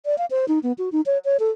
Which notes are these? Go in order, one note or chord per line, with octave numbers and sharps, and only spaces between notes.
D5
F5
C5
D#4
B3
F#4
D#4
C#5
C#5
A4